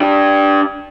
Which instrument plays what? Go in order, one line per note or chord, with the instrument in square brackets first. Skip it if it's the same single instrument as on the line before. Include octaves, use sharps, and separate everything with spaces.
[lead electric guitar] D4 G4